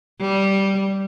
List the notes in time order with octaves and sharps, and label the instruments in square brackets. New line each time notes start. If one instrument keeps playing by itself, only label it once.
[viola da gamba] G3